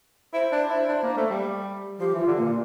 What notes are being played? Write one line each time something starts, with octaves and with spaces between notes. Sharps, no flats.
E4 C5
D4
E4
D4
A#3
A3
G3
F3 G4
E3
F4
D3
A#2 A#3